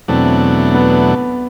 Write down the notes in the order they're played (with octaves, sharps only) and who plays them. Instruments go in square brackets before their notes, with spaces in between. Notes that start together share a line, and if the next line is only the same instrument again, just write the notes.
[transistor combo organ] E2 B2 F#3 A3 D4 [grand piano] C4
[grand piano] B3